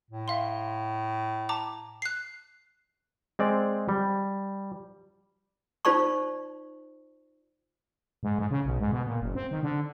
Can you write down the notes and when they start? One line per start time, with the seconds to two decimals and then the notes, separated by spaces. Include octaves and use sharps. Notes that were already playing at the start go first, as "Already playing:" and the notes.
0.11 A2
0.28 E5 F5 C6
1.49 A5 A#5 D6
2.02 F#6 C7
3.39 G#3 C4 D5
3.89 G3
5.85 D#4 F4 C5 D5 A5 C#6
8.23 G#2
8.39 G#2
8.51 C#3
8.65 B1
8.80 G#2
8.92 B2
9.07 A#2
9.21 F#1
9.35 C4
9.51 D#3
9.63 D3